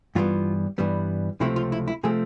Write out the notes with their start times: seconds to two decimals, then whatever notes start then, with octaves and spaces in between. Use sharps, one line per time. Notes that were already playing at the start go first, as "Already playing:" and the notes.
0.15 G2 E3 G3 B3 F4
0.78 G2 E3 G3 B3
1.40 C#2 C3 F3 A3 C4 E4
1.56 F4
1.72 E4
1.88 E4
2.03 C3 F3 A3 C4 G#4